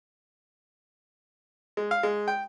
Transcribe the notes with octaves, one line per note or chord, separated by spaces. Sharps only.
G#3
F5
G#3
G5